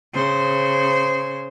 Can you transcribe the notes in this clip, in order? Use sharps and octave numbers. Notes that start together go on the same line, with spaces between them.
C#3 C5